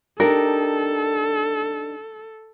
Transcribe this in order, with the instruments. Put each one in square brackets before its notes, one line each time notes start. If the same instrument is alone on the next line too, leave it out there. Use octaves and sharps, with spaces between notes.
[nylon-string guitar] D4 D#4 G4 [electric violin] A4 [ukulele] A#4